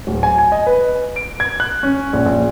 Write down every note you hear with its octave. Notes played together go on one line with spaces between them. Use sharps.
D1
G#5
G#5
D#5
B4
D7
G#6
F#6
C#4
A#1
A#1